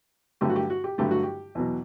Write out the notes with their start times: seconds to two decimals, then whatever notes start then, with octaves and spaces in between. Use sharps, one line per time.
0.41 G2 D3 F#3 A3 G4
0.50 F#4
0.56 G4
0.70 F#4
0.84 G4
0.98 G2 D3 F#3 A3 G4
1.11 F#4
1.23 G4
1.55 E2 B2 F#3